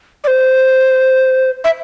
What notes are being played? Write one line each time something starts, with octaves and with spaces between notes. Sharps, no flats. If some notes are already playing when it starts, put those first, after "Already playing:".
D5
C5
E5